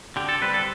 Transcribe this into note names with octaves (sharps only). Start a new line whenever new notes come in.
D3 G4
A4
G3 C4 B4
A4